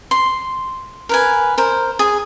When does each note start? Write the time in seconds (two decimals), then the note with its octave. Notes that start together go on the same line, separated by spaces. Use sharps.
0.11 C6
1.09 A#4 B4 G#5
1.58 A#4 C5
1.99 G#4